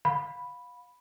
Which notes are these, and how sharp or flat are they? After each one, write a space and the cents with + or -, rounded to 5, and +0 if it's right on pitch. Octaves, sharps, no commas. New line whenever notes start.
F5 +25 B5 +0